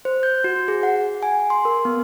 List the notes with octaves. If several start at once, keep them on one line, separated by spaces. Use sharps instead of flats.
C5
G6
F#4
G#4
F#5
G#5
C6
A#4
B3